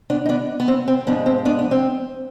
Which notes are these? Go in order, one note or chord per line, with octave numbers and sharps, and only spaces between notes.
B3 D4
D#4
B3 D4
B3
C4
C4
G#2 F3 G#3 B3 D4
C4
B3 D4
B3
C4